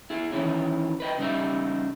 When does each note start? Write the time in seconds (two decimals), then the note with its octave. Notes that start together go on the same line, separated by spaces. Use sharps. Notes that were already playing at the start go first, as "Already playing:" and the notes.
0.10 E4 G#4
0.32 D#3 E3 C#4 E4
1.00 B4 D#5 G5
1.18 C#3 G3 D#4 G4 E5